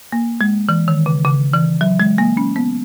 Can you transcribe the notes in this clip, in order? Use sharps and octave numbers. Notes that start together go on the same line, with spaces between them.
A#3
G#3
E3
D#3
C#3
C#3
E3
F#3
G#3
A#3
C#4
B3